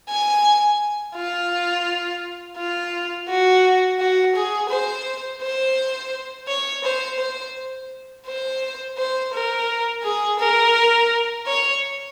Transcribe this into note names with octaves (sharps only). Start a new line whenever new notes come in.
G#5
F4
F4
F#4
F#4
G#4
C5
C5
C#5
C5
C5
C5
C5
A#4
G#4
A#4
C#5